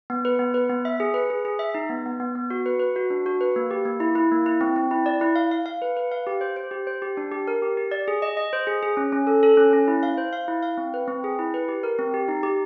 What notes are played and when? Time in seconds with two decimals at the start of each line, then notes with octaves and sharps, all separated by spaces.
0.10 B3
0.25 B4
0.39 B3
0.54 B4
0.69 B3
0.85 E5
1.00 G#4
1.14 B4
1.30 G#4
1.45 G#4
1.59 E5
1.75 D#4
1.89 B3
2.06 B3
2.20 B3
2.35 B3
2.50 F#4
2.66 B4
2.80 B4
2.96 F#4
3.10 D4
3.26 F#4
3.41 B4
3.56 A#3
3.71 G4
3.85 A#3
4.00 E4
4.15 E4
4.31 A#3
4.46 E4
4.61 C4
4.76 C4
4.91 E4
5.06 D5
5.21 E4
5.36 F5
5.51 F5
5.66 F5
5.82 B4
5.97 B4
6.12 F5
6.27 G4
6.41 C5
6.56 C5
6.71 G4
6.87 C5
7.02 G4
7.17 D4
7.31 G4
7.48 A#4
7.62 G4
7.77 G4
7.91 D5
8.08 G#4
8.22 D#5
8.37 D#5
8.53 C5
8.67 G#4
8.83 G#4
8.97 C#4
9.12 C#4
9.27 A4
9.43 A4
9.57 C#4
9.73 C#4
9.88 E4
10.03 F5
10.18 C5
10.33 F5
10.48 E4
10.63 F5
10.78 C4
10.94 B4
11.08 C4
11.24 G#4
11.39 E4
11.54 B4
11.68 G4
11.83 A#4
11.99 C4
12.14 G4
12.28 D#4
12.43 G4